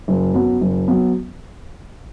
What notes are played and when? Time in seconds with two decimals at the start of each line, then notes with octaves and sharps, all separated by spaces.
0.08 F#1
0.34 F#2 F#3 B3
0.61 F#1
0.88 F#3 B3